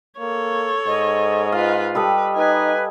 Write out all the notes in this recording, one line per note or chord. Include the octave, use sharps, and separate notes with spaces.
A#3 A4 C#5
G#2 D#5
F4 B4 F5
G3 A4 B4 D#5
D#4 B4 G#5